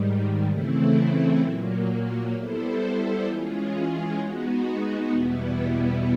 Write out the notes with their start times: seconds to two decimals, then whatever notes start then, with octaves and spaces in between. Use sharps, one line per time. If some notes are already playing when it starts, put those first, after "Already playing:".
Already playing: G#2 D#3 G3
0.48 C#3 E3 A3 C4 E4
1.40 A#2 F#3 A#3
2.33 G3 B3 E4 A4 C5
3.26 E3 G#3 C#4 F4 G#4
4.18 G#3 B3 D#4 F#4
5.11 E2 B2 G3 B3 E4